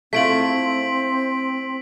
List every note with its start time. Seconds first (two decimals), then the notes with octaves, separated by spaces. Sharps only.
0.13 A3 C4 E4 F4 B6 D7 F#7